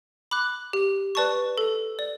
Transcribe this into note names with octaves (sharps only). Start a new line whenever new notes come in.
B5 D6 F#6
G4
B4 D5 A5 C#6
A4
D5